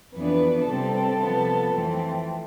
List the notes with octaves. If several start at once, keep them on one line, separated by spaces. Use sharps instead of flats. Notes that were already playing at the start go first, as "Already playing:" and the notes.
F2 E3 B3 D4 B4
C3 G3 C4 A4
C3 F3 B3
F2 E3 A3 C4